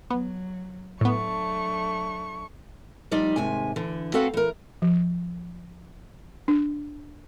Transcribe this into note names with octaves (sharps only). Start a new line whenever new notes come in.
F#3 B3
A2 F#3 A3 B3 D4 C#6
F3 G3 D#4 D5
D#2 G#2 C3 G#5
D3 E3
C4 F#4 A4 B4 F5 F#5
E3 A#4
F3
D4